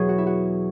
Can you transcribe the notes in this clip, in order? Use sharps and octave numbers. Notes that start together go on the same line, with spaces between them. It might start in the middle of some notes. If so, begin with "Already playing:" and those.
Already playing: E2 B2 F#3 G#4 B4 C#5
F#4
E4
F#4